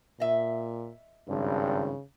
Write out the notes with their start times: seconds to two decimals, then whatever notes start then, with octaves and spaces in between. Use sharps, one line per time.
0.20 A#2 D#5 E5
1.29 G#1 G2 C#3